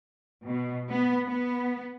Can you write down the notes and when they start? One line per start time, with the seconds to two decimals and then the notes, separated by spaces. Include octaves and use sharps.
0.45 B2
0.90 B3
1.27 B3